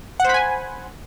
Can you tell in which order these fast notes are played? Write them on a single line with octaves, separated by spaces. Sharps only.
F#5 C5 B5 G#5